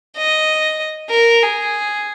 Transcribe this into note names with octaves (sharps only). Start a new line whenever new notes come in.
D#5
A#4
G#4